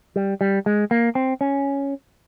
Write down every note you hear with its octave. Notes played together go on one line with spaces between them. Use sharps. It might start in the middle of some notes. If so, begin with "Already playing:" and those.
G3
G3
G#3
A#3
C4
C#4